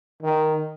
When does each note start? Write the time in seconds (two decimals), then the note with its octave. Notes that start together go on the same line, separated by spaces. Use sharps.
0.23 D#3